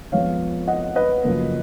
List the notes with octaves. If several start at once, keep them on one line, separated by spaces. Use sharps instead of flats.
F2 F3 G#3 B3 C#5 F5
D#5 F#5
B4 D#5
F#2 C#3 F3 A#3